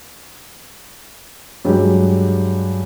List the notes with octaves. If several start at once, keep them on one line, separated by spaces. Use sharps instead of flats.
G2 F#3 G#3 G4